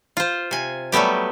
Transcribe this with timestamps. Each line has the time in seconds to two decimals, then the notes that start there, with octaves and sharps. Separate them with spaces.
0.17 F4 C5
0.51 C3 G#5
0.92 F#3 G3 A3 B3 G4